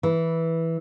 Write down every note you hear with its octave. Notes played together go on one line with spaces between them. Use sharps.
E3